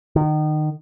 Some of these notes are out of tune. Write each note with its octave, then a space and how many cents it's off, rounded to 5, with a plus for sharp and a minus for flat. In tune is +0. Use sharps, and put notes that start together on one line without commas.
D#3 -30